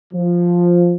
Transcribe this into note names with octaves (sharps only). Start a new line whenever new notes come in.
F3